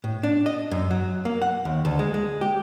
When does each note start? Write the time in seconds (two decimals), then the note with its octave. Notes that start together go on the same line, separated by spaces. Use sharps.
0.04 A2
0.23 D4
0.46 D#5
0.71 F#2
0.91 F#3
1.25 A#3
1.42 F#5
1.65 D#2
1.85 D2
1.99 G#3
2.14 G#3
2.41 G4